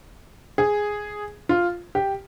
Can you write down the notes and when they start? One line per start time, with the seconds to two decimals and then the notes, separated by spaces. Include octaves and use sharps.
0.58 G#4
1.49 F4
1.95 G4